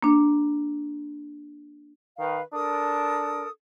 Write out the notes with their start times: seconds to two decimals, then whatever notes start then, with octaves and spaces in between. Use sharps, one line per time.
0.03 A#3 D4
2.19 D#3 B4 F5
2.53 D4 A4 A#4 D#6